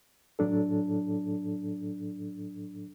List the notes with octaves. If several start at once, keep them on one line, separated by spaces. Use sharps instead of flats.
A2 F#3 D4 A4